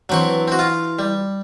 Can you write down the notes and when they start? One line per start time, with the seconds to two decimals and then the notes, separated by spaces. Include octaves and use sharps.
0.09 E3 F#3 C4 D4 C#6
0.48 C4 F#4
0.59 F4 F5
0.99 G3